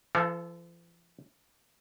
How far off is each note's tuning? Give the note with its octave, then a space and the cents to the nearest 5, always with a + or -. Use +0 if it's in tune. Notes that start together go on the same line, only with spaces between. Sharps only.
F3 -45 A4 +0 F5 +0